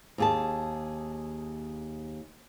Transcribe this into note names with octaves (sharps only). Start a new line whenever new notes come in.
D#2 G#4 A5